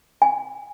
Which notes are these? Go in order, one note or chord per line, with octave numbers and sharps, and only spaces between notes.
G#5